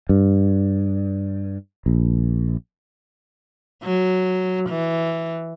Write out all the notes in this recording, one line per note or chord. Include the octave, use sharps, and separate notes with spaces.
G2
A#1
F#3
E3